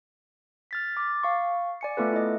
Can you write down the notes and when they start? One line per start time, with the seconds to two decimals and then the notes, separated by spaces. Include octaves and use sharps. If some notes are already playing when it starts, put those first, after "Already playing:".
0.71 F6 A6 B6
0.97 D6 A6
1.23 F5 C#6
1.81 D5 G#5 C#7
1.97 A3 B3 F4 A4 B4
2.13 E4 D#5